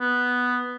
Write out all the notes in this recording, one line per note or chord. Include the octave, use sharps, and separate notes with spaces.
B3